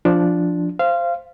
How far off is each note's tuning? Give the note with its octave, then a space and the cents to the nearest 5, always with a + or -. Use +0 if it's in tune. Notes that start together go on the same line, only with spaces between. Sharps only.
F3 +0 D4 +0
C5 +0 F5 -20